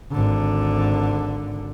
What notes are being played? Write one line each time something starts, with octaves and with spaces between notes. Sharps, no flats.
G#1 D3